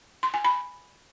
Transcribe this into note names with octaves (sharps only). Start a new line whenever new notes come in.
C6
G#5
B5